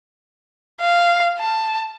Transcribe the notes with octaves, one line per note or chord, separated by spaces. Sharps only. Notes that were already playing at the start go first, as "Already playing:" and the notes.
F5
A5